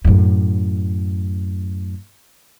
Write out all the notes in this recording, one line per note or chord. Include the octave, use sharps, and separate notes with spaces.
F#2 A2